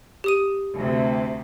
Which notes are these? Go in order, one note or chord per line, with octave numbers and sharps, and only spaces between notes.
G4 D#6 D#7
D2 C3